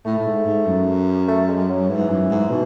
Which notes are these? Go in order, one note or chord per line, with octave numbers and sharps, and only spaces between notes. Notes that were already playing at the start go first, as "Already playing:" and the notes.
A2 A3
A2
G#2
G#2
F#2
A3
G#3
F#3
G#2 E3
F#2
G#2
B2